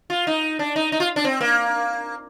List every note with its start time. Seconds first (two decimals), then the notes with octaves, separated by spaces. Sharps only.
0.10 F4
0.27 D#4
0.59 D4
0.76 D#4
0.92 D#4
1.00 F4
1.16 D4
1.24 C4
1.41 A#3